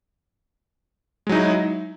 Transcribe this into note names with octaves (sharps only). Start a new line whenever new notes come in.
F#3 G#3 D#4 E4